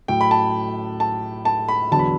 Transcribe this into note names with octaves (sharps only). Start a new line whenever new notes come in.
A2 F#3 G5
B5
A5
A5
A5
B5
E2 D3 F#3 A5
B5